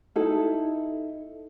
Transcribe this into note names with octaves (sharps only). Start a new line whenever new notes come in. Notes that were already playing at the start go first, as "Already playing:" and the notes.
D#4 E4 A4